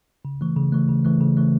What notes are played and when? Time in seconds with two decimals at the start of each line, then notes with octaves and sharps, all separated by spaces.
0.25 C#3
0.41 E3 A3
0.56 C#3
0.72 E3 A3
0.89 C#3
1.04 E3 A3
1.20 C#3
1.37 E3 A3